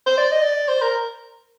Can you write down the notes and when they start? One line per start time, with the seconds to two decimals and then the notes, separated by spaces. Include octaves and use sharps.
0.07 C5
0.17 D5
0.31 D#5
0.43 D5
0.68 C5
0.82 A#4